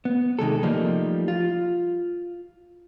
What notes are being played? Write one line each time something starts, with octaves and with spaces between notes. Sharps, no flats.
B3
C3 D#3 G#3 A4
F3 G3 A3 A#3 D#4
F4